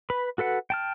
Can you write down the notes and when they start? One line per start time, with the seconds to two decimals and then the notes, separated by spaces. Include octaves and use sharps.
0.10 B4 B5
0.38 F#4 A4 B4 F#5
0.70 G5 A5 F6